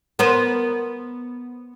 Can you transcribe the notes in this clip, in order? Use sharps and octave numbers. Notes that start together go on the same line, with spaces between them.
B3 A#4 C5